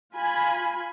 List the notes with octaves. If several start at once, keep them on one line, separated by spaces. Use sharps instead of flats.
F4 G#5 B5